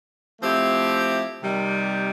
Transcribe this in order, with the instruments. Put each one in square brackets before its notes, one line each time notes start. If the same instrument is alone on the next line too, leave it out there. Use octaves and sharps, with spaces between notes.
[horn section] F3 A3 C4 E4 G4
C3 D#3 G3